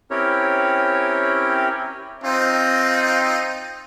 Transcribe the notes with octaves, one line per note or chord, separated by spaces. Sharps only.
C4 C#4 E4 G4 A#4 C#5
C4 D#4 F4